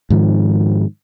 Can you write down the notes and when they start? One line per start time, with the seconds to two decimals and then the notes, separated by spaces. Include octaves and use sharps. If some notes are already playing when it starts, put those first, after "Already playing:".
0.10 G#2 D#3 F3